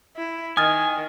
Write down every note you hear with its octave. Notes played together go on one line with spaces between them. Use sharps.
E4
D#3 G#5 D#6 F6 A6